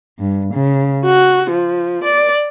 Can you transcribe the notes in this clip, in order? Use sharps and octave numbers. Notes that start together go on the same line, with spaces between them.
G2
C#3
F#4
F3
D5